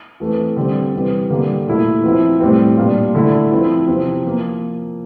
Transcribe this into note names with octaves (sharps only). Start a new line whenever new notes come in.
E3 A3 C4
D3 G3 C4
C3 E3 G3
D3 G3 A#3
A#2 A3 E4
F3 C4 E4
A2 G3 C4
A#2 G3 D4 F4
D3 A3 E4
F3 C4 E4
C3 F3 C4
F3 A#3 F4